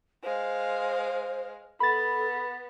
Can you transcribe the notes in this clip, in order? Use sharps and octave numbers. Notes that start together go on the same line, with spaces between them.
G#3 C5 F5
B3 A4 B5 A6